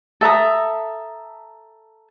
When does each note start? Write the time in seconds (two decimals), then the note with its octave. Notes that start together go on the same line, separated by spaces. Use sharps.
0.21 A4 E5 A#5 D#6